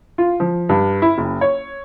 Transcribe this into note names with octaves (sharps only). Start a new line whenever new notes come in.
F4
F3
G2
E4
F#1
C#5